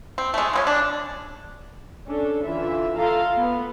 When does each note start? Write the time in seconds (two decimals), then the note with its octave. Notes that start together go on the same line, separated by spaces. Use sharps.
0.18 C4
0.34 G#3 A3
0.53 G#3 C4 C#4
0.67 D4
2.07 C#4 D4 A4
2.45 D3 E3 F4 E5
2.98 F4 A4 F5 A#5 C6
3.37 B3